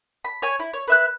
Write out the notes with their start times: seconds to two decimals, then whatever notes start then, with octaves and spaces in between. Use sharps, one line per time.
0.24 B5
0.42 C#5 G#5
0.59 E4
0.73 C#5
0.88 B4 E5 F#6